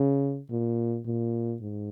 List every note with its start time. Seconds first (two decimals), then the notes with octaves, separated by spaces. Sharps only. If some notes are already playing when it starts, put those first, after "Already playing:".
Already playing: C#3
0.51 A#2
1.06 A#2
1.61 G#2